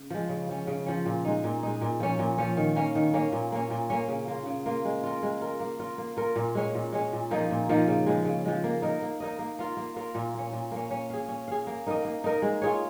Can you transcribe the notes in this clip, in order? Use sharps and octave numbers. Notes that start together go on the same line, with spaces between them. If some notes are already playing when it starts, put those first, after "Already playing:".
Already playing: C#3
F3 G#3
C#3
F3 C#4
C#3
F3 C#4
A#2
G#3 D#4
A#2
G#3 D#4
A#2
F3 C#4
A#2
F3 C#4
D#3
A#3 C#4
D#3
A#3 C#4
A#2
A#3 C#4
A#2
A#3 C#4
C#3
A#3 F4
C#3
A#3 F4
G#3
F4 A#4
G#3
F4 A#4
A#3
F4 A#4
A#3
F4 A#4
A#2
G#3 C#4 G#4
A#2
G#3 C#4 G#4
A#2
F3 A#3 D#4
A#2
F3 A#3 D#4
C#3
F3 G#3
C#3
F3 G#3
A#3
D#4 A#4 D#5
A#3
D#4 A#4 D#5
A#3
F4 A#4 F5
A#3
F4 A#4 F5
A#2
A#3 C#4
A#2
A#3 C#4
C#4
G#4 F5
C#4
G#4 F5
A#3
D#4 A#4 D#5
A#3
D#4 A#4 D#5
G#3
F4 G#4 C#5